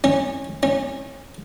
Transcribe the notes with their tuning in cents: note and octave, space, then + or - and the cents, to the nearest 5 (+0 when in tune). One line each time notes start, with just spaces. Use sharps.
C#4 -20
C#4 -25